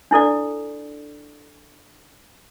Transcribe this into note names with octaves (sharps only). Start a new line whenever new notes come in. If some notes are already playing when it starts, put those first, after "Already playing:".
D4 E4 A4 D5